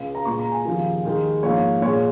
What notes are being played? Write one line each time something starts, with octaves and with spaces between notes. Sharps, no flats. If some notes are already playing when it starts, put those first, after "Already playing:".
Already playing: C#2 C#3 G#3
A#5
A#2 G#3 C#6
A#5
G#5
D#2 C#3 F3
D#2 D#3 G#3
G#2 F3 A#3 C#5
A#2 G#3 C#5